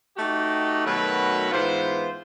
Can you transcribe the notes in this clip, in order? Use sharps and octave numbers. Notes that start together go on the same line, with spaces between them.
A3 D#4 F#4 G4
B2 D#3 F#3 A3 A#4 B4
G#2 E3 B3 F4 C5